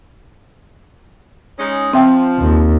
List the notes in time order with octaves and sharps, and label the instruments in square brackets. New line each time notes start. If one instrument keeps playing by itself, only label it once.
[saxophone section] G#3 C#4 D#4
[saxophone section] F3 [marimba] C4 E5 G5
[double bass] D#2